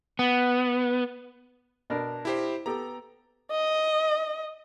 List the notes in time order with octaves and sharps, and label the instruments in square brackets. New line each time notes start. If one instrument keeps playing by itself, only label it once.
[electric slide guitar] B3
[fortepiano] B2 D4 A#4
[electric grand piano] E4 G4 C5
[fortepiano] B3 G4 A4 [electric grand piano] A#5
[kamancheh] D#5